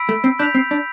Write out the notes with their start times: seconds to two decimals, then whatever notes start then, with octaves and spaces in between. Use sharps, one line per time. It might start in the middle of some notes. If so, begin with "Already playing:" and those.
Already playing: B5 E6 B6 D7
0.09 A3
0.24 C4
0.39 D4 G6 B6 F7
0.55 C4
0.71 D4